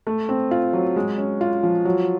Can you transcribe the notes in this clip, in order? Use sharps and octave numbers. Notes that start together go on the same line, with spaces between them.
A3
C4
F4
F#3
G#3
C#4
F4
F3
F#3